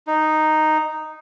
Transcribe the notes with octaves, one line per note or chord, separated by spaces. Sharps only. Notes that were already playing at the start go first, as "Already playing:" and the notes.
D#4